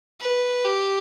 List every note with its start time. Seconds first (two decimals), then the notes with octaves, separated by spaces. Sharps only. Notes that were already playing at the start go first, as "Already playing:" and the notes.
0.21 B4
0.65 G4